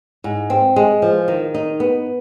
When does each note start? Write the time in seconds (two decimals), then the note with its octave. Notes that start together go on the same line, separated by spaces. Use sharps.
0.24 G#2
0.50 C4
0.76 G#3
1.02 F3
1.28 D#3
1.54 D#4
1.80 B3